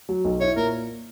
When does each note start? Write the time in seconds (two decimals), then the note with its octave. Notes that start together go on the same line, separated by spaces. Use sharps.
0.09 F#3
0.24 B1
0.41 E4 C#5
0.57 A#2 A#4